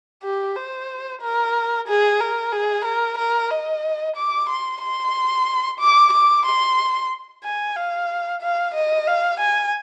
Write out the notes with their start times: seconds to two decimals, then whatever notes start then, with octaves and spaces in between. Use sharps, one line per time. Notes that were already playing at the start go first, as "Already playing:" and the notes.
0.23 G4
0.56 C5
1.21 A#4
1.87 G#4
2.20 A#4
2.52 G#4
2.85 A#4
3.18 A#4
3.50 D#5
4.16 D6
4.49 C6
4.82 C6
5.79 D6
6.12 D6
6.46 C6
7.44 G#5
7.76 F5
8.41 F5
8.74 D#5
9.07 F5
9.40 G#5